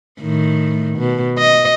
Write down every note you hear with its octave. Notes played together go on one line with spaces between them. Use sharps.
A2 D#3
B2
D#5